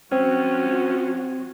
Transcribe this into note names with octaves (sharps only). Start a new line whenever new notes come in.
F3 C4 C#4 F4 F#4